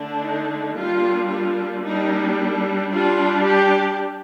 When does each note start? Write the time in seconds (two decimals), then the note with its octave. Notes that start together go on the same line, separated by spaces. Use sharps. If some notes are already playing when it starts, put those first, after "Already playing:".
Already playing: D3 A3 D4
0.22 D#4
0.75 G3 A#3 D4 F4
1.30 F4
1.85 G3 A#3 D4 D#4
2.92 G3 D4 F4
3.46 G4